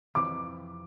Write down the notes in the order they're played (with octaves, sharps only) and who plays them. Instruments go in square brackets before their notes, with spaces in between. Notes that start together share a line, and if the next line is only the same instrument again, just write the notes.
[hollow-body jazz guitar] F2 C3 E3 [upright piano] D6